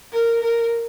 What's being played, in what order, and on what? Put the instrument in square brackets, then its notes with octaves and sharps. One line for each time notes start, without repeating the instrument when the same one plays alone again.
[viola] A#4
A#4